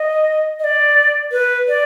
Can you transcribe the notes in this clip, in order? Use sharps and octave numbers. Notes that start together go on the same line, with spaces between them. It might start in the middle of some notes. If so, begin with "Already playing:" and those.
Already playing: D#5
D#5
D5
B4
D5